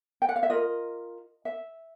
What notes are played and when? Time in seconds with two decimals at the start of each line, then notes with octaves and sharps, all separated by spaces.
0.22 G5
0.29 F#5
0.36 F5
0.43 E5
0.50 F4 A#4 D#5
1.45 E5